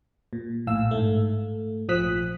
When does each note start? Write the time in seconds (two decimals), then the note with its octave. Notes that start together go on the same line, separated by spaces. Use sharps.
0.33 A#2
0.67 A#1 A2 F5 E6
0.91 G#2 A3
1.89 A#1 F3 D#6 F#6 B6